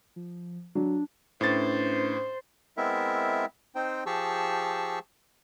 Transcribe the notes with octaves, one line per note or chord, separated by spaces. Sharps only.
F3
F#3 D4
A2 C#4 D4 B4 C5 A6
G#3 B3 C4 E4 A#4 E5
C4 D#4 C5 G5
F3 G4 G#4 A5 C#6 E6